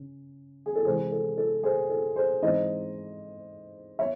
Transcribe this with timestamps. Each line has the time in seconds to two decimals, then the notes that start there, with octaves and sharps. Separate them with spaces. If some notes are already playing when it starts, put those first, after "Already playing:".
Already playing: C#3 C#4
0.66 G#4
0.76 A4
0.85 C3 E3 G#3 G#4 C5
1.12 A4
1.38 A4
1.63 G#4 C5
1.90 A4
2.16 G#4 C5
2.42 G#2 E3 C4 D#4 C5 D#5
3.99 C#5 E5